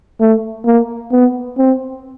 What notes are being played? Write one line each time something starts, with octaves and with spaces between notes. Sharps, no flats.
A3
A#3
B3
C4